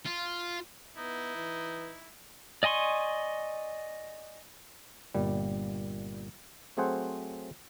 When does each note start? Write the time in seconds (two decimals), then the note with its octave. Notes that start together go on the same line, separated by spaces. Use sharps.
0.05 F4
0.97 B3 D#4 E4
1.36 E3
2.63 D5 D#5 G#5 C6 C#6
5.15 G1 A#2 G3
6.77 F#3 A3 C4 G#4 C5 F#5